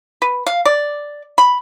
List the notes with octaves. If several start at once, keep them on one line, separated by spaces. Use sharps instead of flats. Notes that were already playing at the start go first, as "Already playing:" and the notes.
B4
F5
D5
B5